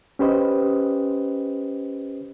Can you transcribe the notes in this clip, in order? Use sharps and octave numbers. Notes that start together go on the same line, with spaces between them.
C#4 G4 B4 C5 D#5